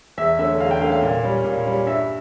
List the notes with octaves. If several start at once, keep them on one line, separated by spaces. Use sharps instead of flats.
E2 E5
D3 A3 C#4 E5
E2 F5
G5
D3 A3 C#4 F5
F5
A#2
G3 C#4
A#2
G3 C#4
G2 E5